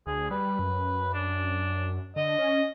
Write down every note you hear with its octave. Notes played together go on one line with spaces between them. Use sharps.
D2 G#4
G3 B4
F#2
D4
D3 D#5
C#4